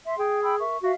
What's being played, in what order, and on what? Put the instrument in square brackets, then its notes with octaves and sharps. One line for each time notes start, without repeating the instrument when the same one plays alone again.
[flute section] E5 C6
[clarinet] G#4 [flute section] G5
[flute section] G5 B5 E6
A#4 E5 C#6
[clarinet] F#4 [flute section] E5 F5